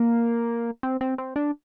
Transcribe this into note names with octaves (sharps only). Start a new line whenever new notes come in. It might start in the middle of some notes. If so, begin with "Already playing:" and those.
Already playing: A#3
C4
C4
C4
D4